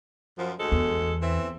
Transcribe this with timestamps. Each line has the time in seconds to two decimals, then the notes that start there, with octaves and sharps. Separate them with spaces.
0.37 F#2 F3
0.59 D2 G#3 A4
0.72 E2
1.22 E3 C4 E5